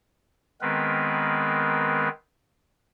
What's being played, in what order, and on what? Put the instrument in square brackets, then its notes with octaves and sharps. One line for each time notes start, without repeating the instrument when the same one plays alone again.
[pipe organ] D#3 G#3 B3 C4 A#4 B4